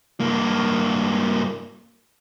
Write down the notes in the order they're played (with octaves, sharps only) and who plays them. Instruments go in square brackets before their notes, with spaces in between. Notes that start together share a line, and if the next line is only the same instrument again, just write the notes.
[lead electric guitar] G2 A#3